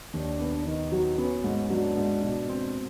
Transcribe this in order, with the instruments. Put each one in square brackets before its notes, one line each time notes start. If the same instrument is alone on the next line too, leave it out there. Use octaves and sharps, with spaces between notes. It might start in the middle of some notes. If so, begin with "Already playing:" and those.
[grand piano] D#2 [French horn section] D4
[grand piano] B3
[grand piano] D#3 [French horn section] D#4
[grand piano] F#3
[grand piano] B3 [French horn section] C#4
[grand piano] G#2
[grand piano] F#3 [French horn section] D4
[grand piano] G#2
B2
C4